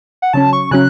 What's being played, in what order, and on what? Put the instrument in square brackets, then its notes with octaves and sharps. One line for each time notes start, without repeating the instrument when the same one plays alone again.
[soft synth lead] F#5
[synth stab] C#3 F#3 C#4 [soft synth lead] A5
[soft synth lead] C#6
[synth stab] C#3 F#3 C#4 [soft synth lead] F#6